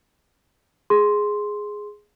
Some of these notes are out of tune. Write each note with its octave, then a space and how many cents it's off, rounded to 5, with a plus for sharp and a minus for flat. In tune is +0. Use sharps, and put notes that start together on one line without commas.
G#4 +0 C6 +0